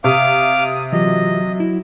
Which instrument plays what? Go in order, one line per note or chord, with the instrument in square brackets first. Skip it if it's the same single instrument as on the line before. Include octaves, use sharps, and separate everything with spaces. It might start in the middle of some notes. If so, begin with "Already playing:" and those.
[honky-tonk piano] C3 [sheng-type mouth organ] F5 D6 [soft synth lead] D#6
[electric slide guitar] E3 F4 G4 [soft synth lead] F#3 [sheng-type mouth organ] D#5
[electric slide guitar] E4